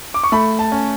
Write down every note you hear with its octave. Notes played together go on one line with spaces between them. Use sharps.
D6
C#6
A3 B5
A5
C#4